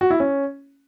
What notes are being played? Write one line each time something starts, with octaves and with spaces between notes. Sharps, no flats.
F#4
E4
C#4